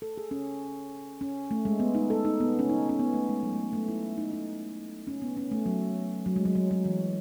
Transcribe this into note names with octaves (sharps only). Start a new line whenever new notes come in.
A4
G#4
C#4
C#4
A3
G#3
B3
D#4
A4
D#4
B3
C#4
D#4
C#4
B3
A3
G#3
F#3
A3
G#3
A3
E4
D#4
D#4
C#4
B3
C#4
A3
F#3
F#3
G#3
F#3
F#3
F#3
E3